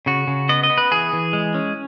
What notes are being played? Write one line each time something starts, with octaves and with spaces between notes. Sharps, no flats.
C#3 F#4
C#3
B3 D#5
D#5
B3
B4
E3 G#4
E3
G#3
C#4